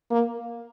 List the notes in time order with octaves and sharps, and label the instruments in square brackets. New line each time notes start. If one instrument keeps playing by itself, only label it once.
[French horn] A#3